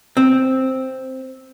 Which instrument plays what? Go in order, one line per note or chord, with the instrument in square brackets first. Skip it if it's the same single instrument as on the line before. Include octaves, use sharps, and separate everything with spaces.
[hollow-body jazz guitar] C4